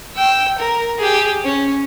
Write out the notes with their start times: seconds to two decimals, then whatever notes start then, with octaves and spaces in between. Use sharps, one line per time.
0.15 G5 E6
0.58 A#4
0.98 G4 G#4
1.44 C#4